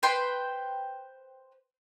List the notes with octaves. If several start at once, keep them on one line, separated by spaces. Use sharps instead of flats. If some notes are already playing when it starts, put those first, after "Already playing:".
B4 C5 G5 C6